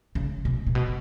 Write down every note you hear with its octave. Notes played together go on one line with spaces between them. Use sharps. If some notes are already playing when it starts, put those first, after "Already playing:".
C#3
B2
A#2
B2